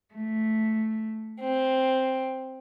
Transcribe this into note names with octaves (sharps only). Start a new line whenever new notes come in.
A3
C4